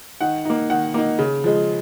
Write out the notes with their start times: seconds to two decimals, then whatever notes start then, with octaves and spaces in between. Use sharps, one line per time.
0.21 D#3 F#5
0.45 A#3 D#4
0.70 D#3 F#5
0.94 A#3 D#4
1.19 C#3
1.44 F3 G#3